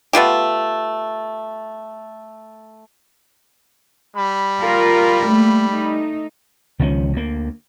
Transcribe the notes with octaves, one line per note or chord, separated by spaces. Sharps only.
A3 B3 F4 G4
G3 B5
F4 A#4
A3 A#3
A3 D#4
C#2 D#3 F3 C#4
D2 A#3